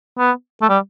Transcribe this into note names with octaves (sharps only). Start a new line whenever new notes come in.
B3
A3
G3